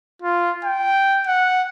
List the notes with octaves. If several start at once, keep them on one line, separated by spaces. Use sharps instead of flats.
F4
G5
F#5